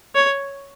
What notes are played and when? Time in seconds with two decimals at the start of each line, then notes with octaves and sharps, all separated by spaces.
0.15 C#5